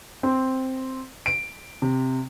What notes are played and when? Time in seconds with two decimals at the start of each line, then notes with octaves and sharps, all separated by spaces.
0.23 C4
1.26 D7
1.82 C3